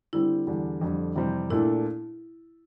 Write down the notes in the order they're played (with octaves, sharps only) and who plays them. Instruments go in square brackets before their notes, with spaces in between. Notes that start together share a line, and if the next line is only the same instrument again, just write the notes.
[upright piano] D3 G3 C4 [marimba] E4
[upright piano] E2 D3 G3 D4
F2 D3 G3
F2 C3 E3 G3 C4
[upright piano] A#2 A3 D4 A4 [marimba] E4